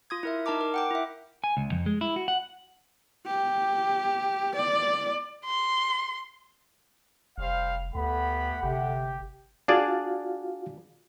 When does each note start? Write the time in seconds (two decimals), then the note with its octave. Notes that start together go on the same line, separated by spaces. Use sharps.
0.10 F4 D#6 G#6
0.23 E4 A#4 E5
0.46 D#4 A#4 A5 A#5 D6
0.61 A#4
0.74 F#5 G5 D6
0.91 E4 E5
1.44 G#5
1.57 C#2
1.72 F2
1.86 G#3
2.01 E4
2.16 F#4
2.28 F#5
3.27 G4
4.56 D5
5.45 C6
7.38 F1 G3 C5 F5
7.95 D2 A3 B3 G4 A4 F#5 B5
8.63 G1 C3 G4
9.68 D4 F4 F#4 G#4 D5 F5